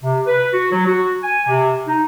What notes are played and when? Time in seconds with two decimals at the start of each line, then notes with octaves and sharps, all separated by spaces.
0.03 C3
0.27 B4
0.53 F#4
0.71 F#3
0.86 F#4
1.23 G#5
1.47 C3
1.88 D#4